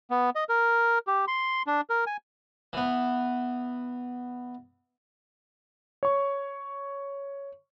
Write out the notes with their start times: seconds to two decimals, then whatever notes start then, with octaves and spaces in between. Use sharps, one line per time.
0.11 B3
0.35 D#5
0.49 A#4
1.07 G4
1.28 C6
1.67 D4
1.90 A#4
2.07 G#5
2.73 E3 B3
6.03 C#5 C#6